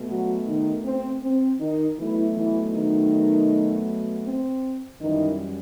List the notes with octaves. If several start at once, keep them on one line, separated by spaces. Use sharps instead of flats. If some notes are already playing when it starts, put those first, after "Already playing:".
Already playing: B2 A3
F#3 F#4
D#3 D#4
C4
C4
D#3 D#4
B2 E3 F#3 A3 E4
E3 E4
D#3 D#4
C4
F#2 D#3 E3 G3 D#4